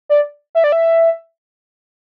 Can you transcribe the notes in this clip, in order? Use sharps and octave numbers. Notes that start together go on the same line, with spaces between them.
D5
E5
D5
E5